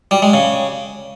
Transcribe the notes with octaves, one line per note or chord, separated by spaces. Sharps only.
G3
G#3
C#3